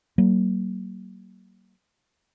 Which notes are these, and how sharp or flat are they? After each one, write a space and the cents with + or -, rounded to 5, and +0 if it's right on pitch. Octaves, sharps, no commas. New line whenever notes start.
F#3 +45 A#3 +0